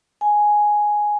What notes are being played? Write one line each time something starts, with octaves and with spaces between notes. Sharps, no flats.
G#5